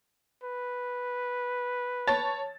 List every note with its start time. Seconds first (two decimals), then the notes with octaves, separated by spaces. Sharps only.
0.43 B4
2.07 C#5 A5 A6